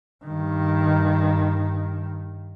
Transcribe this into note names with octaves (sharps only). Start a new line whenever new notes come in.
G2 D#3